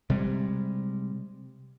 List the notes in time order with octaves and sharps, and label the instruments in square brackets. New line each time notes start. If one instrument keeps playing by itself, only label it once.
[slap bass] C3 G3 G#3